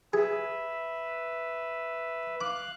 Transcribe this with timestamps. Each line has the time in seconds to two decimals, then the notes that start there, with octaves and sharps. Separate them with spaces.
0.13 G#4 B4 E5
2.41 F5 D6 F#6